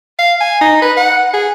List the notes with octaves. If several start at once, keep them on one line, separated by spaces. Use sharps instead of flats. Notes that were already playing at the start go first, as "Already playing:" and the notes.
F5
G#5
D#4
B4
F#5
G#4